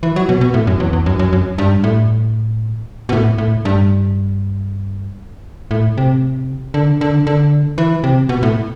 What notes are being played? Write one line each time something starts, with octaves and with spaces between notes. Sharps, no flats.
E3
F#3
B2
B2
A2
F#2
E2
E2
F#2
F#2
F#2
G2
A2
B2
A2
A2
G2
A2
C3
D3
D3
D3
E3
C3
B2
A2